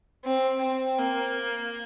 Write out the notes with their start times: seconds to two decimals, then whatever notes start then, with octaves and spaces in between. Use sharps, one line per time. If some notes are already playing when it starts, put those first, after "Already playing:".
0.24 C4
0.61 C4
0.99 A#3